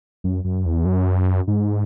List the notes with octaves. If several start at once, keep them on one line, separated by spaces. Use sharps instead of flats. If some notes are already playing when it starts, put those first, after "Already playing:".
F#2
F#2
E2
F#2
G#2